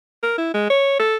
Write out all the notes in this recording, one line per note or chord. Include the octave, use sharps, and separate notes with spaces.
A#4
E4
G#3
C#5
A4